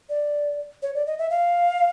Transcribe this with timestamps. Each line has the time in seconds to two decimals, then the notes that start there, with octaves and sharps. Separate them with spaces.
0.09 D5
0.82 C#5
0.94 D5
1.07 D#5
1.19 E5
1.30 F5